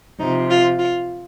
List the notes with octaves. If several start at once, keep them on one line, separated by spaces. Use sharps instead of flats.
C3 F3 D#4
F4
F4